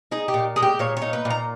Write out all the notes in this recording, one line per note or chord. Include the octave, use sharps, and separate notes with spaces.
D#4 G#4
G4
A#2
G#3 G#4
G4
A#2 C#5
D#4 C#5
B4
A#2
A#5